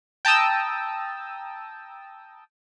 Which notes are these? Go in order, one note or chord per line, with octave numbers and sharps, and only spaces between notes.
G5 A5 A#5 D#6 E6